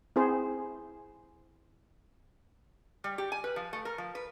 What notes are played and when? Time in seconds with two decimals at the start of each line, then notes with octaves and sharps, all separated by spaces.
0.16 C4 E4 G#4 C5
3.04 G3
3.18 G4
3.32 G#5
3.44 B4
3.56 F3
3.73 A3
3.85 A#4
3.98 F3
4.15 B4